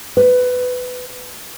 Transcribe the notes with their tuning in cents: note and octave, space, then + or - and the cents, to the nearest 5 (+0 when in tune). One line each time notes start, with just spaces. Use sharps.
B4 +15